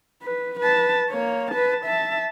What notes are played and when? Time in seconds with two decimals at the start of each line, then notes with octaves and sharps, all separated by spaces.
0.22 B4
0.60 B4 A5
1.10 A#3 C#5
1.51 B4 A5
1.85 E5 A5